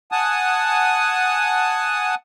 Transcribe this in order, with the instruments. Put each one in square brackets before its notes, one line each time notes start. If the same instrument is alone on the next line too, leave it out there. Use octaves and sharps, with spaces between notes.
[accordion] F#5 G#5 A5 D#6